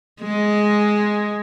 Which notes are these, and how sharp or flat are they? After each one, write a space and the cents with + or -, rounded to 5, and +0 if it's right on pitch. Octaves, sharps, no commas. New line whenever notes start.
G#3 +5